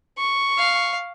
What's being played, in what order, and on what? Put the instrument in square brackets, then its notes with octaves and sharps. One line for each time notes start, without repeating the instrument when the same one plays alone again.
[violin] C#6
[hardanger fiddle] F5